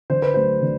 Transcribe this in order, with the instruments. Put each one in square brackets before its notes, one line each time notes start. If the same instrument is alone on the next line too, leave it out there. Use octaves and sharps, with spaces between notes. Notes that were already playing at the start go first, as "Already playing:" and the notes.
[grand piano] D3 C5
B4
F#3 A3 C5
D3